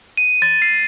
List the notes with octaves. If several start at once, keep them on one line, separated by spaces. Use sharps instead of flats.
D#7
A6
C7